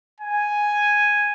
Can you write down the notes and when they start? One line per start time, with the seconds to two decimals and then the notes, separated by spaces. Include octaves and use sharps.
0.20 G#5